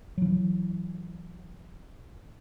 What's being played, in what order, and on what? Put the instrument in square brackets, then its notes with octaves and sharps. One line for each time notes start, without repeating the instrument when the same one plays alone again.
[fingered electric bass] E3 F#3